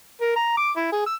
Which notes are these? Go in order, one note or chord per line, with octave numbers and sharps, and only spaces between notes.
A#4
A#5
D6
E4
G#4
E6